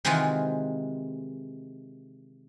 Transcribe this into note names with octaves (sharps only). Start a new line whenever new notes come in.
C3 D#3 E3 G#3 F4 F#4